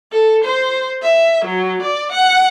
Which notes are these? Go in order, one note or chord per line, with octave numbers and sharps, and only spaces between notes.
A4
C5
E5
F#3
D5
F#5